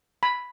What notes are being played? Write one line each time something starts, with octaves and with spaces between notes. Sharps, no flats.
B5